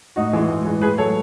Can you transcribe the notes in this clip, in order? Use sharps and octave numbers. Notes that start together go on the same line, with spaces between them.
A2 D#4 F#4
E3 G#3
A2
E3 G#3
A2 G#4 B4
F#3 A4 C#5